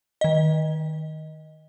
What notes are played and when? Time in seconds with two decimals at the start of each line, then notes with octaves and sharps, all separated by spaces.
0.21 D#3 D#5